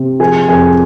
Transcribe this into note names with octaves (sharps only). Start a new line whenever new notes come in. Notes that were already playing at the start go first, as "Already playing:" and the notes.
Already playing: C3
F3 G#4 G#5
F2 G#4 G#5